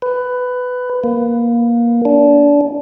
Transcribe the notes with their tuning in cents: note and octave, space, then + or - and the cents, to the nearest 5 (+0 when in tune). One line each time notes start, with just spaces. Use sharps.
B4 +15
A#3 +15
D4 -25